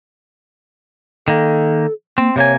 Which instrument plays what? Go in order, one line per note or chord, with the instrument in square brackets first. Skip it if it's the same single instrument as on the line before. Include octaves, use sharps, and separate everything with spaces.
[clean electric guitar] D#3 A#3 [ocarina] A4
[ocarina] A#3 [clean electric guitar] C4
[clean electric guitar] C3 A#3 G#5 [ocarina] C#5